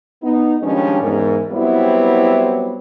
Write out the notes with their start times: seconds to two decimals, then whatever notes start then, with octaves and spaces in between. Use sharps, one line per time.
0.23 B3 D#4
0.62 D#3 F3 G3 G#3 C#4 D4
1.01 E2 G#2 A#4
1.51 F#3 G3 B3 C4 E4